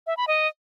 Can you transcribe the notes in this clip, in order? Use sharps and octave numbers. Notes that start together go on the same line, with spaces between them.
E5
B5
D#5